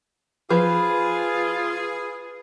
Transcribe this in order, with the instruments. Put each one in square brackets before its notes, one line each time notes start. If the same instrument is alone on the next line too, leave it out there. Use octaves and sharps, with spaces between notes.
[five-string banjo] F3 [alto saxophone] F4 [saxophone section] G#4 [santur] B4